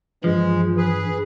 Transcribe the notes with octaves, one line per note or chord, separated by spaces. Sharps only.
G2 E3 F3 G#3
G#4 B4